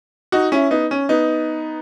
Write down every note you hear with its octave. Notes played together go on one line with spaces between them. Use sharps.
D#4 F#4
C#4 E4
B3 D#4
C#4
B3 D#4